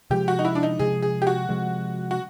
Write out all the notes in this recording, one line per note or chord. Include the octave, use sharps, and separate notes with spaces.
C3 F3 G#3 G4
F#4
D#4
E4
D4
D#4
C3 F3 G#3 G#4
G#4
G4
F#4
C3 F3 G#3
F#4